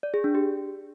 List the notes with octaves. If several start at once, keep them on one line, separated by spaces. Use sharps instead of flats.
D5
G#4
D4
G4